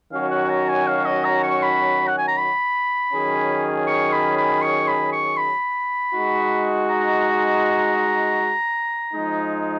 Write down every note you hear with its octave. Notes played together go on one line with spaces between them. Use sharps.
D#3 F#3 C#4 F#4 F5
F#5
A#5
G#5
F5
D#5
A#5
C#6
B5
F#5
G#5
A#5
B5
D#3 F#3 C#4 G#4
C#6
B5
B5
C#6
B5
C#6
B5
G#3 D#4 F#4
A#5
F3 G#3 D#4